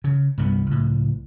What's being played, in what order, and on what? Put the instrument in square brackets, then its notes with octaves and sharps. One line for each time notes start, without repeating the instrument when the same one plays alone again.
[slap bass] C#3
C2 G2 F#3 B3
C#2 A2